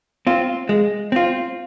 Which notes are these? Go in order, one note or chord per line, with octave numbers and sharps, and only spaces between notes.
C4 F4
G#3
C4 F4